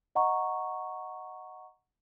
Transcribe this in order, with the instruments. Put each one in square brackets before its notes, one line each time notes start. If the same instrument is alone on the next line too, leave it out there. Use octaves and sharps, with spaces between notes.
[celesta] D#5 F#5 A#5 C#6